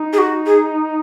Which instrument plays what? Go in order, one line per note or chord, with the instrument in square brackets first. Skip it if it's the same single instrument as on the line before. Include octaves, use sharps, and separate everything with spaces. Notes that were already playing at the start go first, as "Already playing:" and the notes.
Already playing: [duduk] D#4
[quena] G#4
F#4
G#4